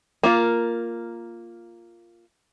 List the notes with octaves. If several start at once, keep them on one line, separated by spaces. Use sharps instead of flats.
A#3 F4